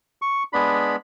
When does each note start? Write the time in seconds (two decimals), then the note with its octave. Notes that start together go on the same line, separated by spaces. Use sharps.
0.22 C#6
0.53 G#3 B3 D4 B5